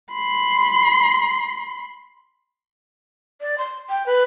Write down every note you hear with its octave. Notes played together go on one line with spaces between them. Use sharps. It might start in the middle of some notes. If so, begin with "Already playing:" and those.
B5 C6
D5
C6
G5
B4